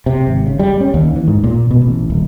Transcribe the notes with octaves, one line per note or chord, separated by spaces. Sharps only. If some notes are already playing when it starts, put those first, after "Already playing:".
C3
G#1
C#3
G3
C#4
D#2
E3
G#2
A#2
B2
A1
D#1